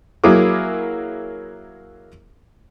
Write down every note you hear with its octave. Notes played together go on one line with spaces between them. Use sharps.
F#3 A#3 E4 G#4 A#4 D6